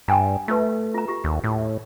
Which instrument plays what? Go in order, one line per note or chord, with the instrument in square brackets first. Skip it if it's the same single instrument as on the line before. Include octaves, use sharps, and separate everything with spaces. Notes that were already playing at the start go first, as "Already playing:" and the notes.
[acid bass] G2 [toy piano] G5 G#5 A#5
[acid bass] A3 [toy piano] F4 B4
[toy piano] F4 A#5
F4 G4
[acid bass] D#2
A2